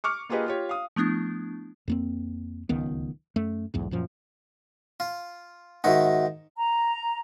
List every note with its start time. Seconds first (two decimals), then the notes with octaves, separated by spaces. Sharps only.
0.04 C#6 D6 F6 C#7
0.29 A#3 F4 G4 G#4 B4 D#5
0.46 F4 G4 C#5
0.69 F5 D#6
0.96 F3 A3 B3 D4 E4
1.88 F2 A#3 C4
2.69 D1 C#2 D#3 B3
3.36 F#2 A3
3.74 B1 E2 G#2
3.91 F#2 A#2 F3
5.00 F4
5.84 G#2 D#3 D#4 F#4 E5 F#5
6.57 A#5